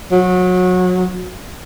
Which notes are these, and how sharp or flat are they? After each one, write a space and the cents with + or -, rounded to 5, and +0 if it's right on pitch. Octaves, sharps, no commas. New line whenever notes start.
F#3 -25